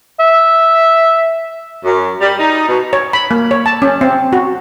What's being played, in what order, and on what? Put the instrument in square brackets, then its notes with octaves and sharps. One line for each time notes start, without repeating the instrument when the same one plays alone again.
[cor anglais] E5
[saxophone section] F#2
G3
D#4
B2
[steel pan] C#5
B5
A#3
C#5
A5
C#4
C4
F#4